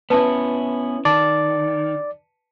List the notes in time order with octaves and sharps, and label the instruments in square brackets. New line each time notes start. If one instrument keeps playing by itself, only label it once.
[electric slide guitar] B3 C#4 E4 [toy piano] B4 A5
[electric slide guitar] D#3 [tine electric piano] D5 [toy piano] A5